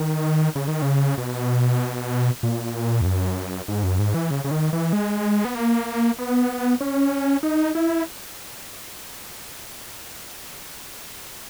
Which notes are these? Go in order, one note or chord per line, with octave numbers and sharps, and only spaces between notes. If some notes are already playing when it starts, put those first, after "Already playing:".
Already playing: D#3
C#3
D#3
C#3
B2
A#2
E2
F#2
G#2
F#2
G#2
E3
C#3
C#3
D#3
E3
G#3
B3
A#3
B3
C#4
D#4
E4